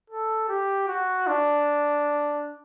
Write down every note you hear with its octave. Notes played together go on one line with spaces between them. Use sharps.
A4
G4
F#4
D4